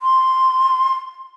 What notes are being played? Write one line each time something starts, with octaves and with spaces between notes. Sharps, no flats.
C6